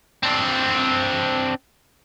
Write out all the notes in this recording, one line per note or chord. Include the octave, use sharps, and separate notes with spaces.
C4 D4